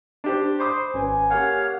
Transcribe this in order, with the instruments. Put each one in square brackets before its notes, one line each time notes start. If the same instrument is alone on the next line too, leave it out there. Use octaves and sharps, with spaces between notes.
[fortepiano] D4 G4 C5
[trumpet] C5 [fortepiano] B5 D6 D#6
[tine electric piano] G#1 C#4 B4 [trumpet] G#5
[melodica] A#3 C#5 F5 [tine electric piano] G4 A#4 F#5